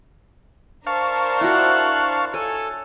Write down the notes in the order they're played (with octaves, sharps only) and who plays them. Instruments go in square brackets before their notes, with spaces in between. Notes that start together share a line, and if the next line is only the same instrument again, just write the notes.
[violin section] D4 A#4 C5 [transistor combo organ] F5 A5 C#6
[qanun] E4 F#4 [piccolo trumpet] F#6
[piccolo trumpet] A4 [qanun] C#5 G#5